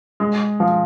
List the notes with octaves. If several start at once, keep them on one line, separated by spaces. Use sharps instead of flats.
G#3
F3